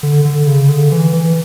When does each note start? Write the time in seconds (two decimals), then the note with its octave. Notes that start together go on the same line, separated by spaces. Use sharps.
0.03 D3
0.25 D3
0.47 C#3
0.69 D3
0.92 E3
1.13 E3